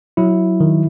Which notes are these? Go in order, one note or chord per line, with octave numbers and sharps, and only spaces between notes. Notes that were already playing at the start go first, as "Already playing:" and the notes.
F#3 E4
D#3